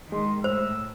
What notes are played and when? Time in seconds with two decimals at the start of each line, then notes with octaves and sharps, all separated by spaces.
0.12 D#3 G#3 C6
0.44 A2 C5 E6